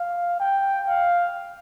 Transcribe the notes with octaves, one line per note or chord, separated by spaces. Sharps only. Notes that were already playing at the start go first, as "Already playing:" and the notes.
Already playing: F5
G5
F5